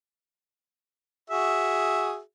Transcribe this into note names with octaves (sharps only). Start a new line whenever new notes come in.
F#4 G#4 E5